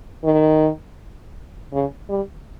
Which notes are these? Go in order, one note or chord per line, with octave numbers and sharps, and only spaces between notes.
D#3
C#3
G3